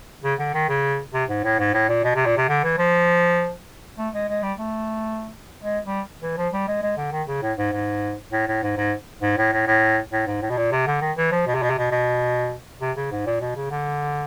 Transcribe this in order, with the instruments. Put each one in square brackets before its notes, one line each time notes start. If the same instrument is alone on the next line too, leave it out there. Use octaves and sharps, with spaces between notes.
[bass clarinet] C#3
D3
D#3
C#3
C3
G#2
A2
G#2
A2
A#2
B2
C3
A#2
C3
D3
E3
F3
A3
G#3
G#3
G3
A3
G#3
G3
E3
F3
G3
G#3
G#3
D3
D#3
C#3
A2
G#2
G#2
A2
A2
G#2
G#2
G#2
A2
A2
A2
A2
G#2
A2
B2
A#2
C3
D3
D#3
E3
F3
B2
C3
B2
C3
B2
B2
C3
C#3
G#2
A#2
B2
C#3
D3